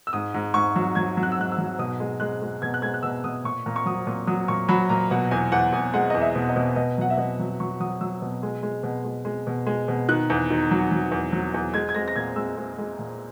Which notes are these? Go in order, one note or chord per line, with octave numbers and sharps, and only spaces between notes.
E6
G#2 D#6
G#2
G#2 C#6
F#3
F#3 G#6
F#3
F#6
E6
G#2 F#6
E6
F#3
B2 D#6
G#3
G#3 F#6
G#3
B2 G#6
F#6
G#3 G#6
F#6
B2 E6
B2 D#6
A#2 C#6
A#2
C#6
F#3 D#6
A#2
F#3 D#6
A#2 C#6
F#3 B5
A#2 A#5
B2 F#5
E2 G#5
E2 F#5
E2 G#5
G#3 F#5
E2 D#5
E5
B2
D#5
B2
B2 D#5
F#3 F#5
E5
B2 D#5
F#3
F#3 C#6
F#3 D#6
F#3 E6
B2
G#3
G#3
B2
G#3
G#3
B2
G#3
B2
D#3 F#6
E2
D#3
F#3
F#3
E2
F#3
E2
G#3 G#6
G#6
G#3 A#6
A#6
A#2 G#6
G#3 E6
G#3
G#3
A#2